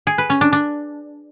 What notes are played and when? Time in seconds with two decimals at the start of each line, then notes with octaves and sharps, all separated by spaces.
0.07 G#4
0.18 B4
0.30 C#4
0.41 D4
0.53 D4